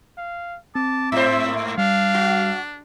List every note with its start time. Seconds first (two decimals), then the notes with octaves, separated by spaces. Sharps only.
0.18 F5
0.75 C4 A5 D6
1.12 G#2 C5 E5
1.48 A#3
1.78 G3 D4 F5
2.15 F#4